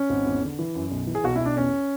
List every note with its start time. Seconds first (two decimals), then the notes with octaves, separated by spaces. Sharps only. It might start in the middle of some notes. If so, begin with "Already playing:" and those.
Already playing: C#4
0.10 G#1
0.25 E2
0.43 D3
0.59 E3
0.75 F#2
0.91 B1
1.07 E3
1.15 G#4
1.24 B1 F#4
1.36 E4
1.41 B1 D4
1.57 E2 C#4